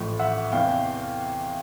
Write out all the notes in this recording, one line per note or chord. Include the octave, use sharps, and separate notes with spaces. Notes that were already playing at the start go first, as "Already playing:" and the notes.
Already playing: A1 A2 F3
E5 F#5
E2 C3 E3 F5 G5